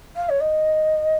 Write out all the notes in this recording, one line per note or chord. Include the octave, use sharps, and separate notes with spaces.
F5
C#5
D#5